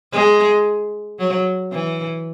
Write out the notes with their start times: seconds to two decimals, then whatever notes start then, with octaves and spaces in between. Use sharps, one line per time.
0.12 G#3
1.19 F#3
1.72 E3